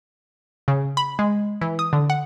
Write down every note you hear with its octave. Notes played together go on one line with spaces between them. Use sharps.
C#3
B5
G#3
E3
D#6
D3
F#5